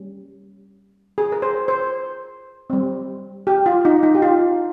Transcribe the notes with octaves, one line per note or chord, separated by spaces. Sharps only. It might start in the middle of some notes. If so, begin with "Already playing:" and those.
Already playing: G3 A#3 C#4
G#4
A#4
C5
C5
G3 C4
G4
F4
D#4
D#4
G4
F4